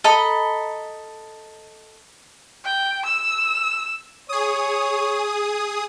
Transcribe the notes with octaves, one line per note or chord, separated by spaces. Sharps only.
A4 D#5 A#5 B5
G5
E6
G#4 C#5 D#6